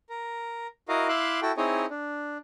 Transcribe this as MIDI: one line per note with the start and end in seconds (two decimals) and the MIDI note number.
0.09 0.67 70
0.88 1.08 64
0.88 1.08 66
0.88 1.08 70
0.88 1.08 75
0.88 1.08 77
1.09 1.40 64
1.09 1.40 76
1.09 1.40 77
1.09 1.40 84
1.09 1.40 86
1.09 1.40 90
1.42 1.52 64
1.42 1.52 66
1.42 1.52 69
1.42 1.52 79
1.57 1.86 60
1.57 1.86 63
1.57 1.86 64
1.57 1.86 68
1.57 1.86 73
1.57 1.86 75
1.90 2.37 62